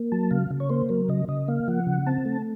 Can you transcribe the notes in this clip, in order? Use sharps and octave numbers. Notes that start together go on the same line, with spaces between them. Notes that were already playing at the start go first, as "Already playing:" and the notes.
Already playing: A#3
F#3 A5
C#3 F5
C#3
C#5
A#3 C5
F#3 A#4
C#3 D#5
C#3 D#5
A#3 F5
F3 F#5
C#3
C4 A5
A3